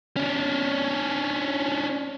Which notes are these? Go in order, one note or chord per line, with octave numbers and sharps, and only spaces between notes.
C#4 D4